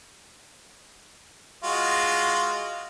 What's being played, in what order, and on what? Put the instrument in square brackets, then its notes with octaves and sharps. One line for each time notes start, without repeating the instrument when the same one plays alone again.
[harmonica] G#3 F4 F#4